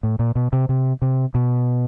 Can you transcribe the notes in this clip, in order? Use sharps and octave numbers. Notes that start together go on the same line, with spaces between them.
A2
A#2
B2
C3
C3
C3
B2